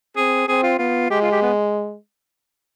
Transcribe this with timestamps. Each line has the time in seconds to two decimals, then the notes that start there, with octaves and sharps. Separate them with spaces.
0.16 C4 G#4
0.48 C4 G#4
0.63 F4
0.79 B3 F4
1.10 G#3 G4
1.22 F4
1.32 G4
1.42 B3